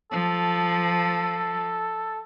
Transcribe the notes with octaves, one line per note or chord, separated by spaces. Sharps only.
F3 A4